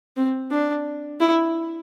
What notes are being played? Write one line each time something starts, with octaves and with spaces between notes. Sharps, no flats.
C4
D4
E4